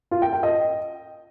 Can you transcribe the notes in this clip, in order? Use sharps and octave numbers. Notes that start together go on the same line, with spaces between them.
F4
G5
G5
D#5